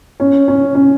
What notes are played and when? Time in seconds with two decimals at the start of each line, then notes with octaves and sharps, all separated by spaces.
0.20 C#4
0.48 C#4
0.75 C#4